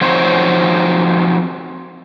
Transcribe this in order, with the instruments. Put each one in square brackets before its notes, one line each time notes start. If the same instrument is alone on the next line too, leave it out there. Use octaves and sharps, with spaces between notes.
[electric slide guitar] F3 F#3 C4 D#4 C5 C#5